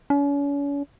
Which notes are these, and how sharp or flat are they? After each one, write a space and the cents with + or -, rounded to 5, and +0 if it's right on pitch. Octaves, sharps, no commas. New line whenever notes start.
C#4 +40